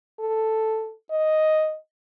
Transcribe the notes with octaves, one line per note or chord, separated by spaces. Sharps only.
A4
D#5